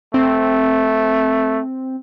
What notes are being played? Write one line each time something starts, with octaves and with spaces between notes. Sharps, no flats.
A3 C4